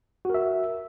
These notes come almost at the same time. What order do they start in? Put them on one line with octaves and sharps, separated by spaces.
F#4 A#4 E5